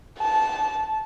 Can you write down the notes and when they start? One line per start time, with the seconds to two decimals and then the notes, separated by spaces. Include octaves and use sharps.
0.19 A5